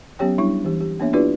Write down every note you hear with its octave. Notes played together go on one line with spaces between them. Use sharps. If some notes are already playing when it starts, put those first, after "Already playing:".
F#3 B3 C#4 G4 C#5 G5
G3 D4 E4 C#5 C#6
E3 G4
G4
A#3 B3 D4 C#5 E5
D4 E4 F4 G4 B4 D5